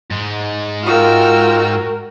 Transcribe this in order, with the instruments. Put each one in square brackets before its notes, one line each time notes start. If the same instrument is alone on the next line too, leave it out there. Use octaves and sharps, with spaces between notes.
[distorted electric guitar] G#2 G#3
[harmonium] F4 [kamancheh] F#4 A#4 [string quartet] G5 E6 F6